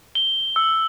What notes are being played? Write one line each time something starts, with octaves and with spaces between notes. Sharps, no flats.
G7
E6